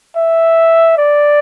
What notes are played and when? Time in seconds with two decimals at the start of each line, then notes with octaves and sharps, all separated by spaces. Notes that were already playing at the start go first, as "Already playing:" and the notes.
0.16 E5
0.97 D5